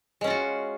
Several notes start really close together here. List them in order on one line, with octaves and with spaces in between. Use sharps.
G#3 C#4 F4 F#4